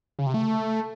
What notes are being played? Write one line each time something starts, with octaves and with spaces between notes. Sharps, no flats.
C#3
C3
A3